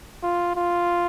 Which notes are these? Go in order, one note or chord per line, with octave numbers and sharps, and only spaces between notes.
F4
F4